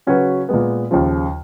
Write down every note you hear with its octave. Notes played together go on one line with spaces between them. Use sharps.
C#3 F#3 C#4 F#4 B4
A#2 G#3 B3
D#2 C#3 F3